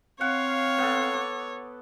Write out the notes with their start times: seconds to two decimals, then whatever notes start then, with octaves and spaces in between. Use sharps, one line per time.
0.21 C4 C#5 F5 F#5
0.78 B3 A4
1.14 D6